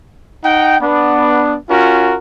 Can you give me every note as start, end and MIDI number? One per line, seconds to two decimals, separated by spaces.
0.44 0.77 63
0.44 0.77 78
0.44 0.77 79
0.81 1.56 59
0.81 1.56 62
1.70 2.16 61
1.70 2.16 65
1.70 2.16 66
1.70 2.16 70